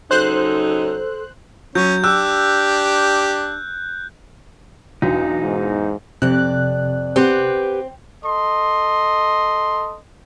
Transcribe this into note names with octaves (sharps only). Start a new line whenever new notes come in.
C#3 F#3 D#4 A4 C5 F#6
F#3 C#4 G6
D4 G4 E6 F#6
B1 E2 D4 D#4 F#4
G#2
F2 C3 D5 F#6
C4 G4 B4 F#5
A4 D#5 C6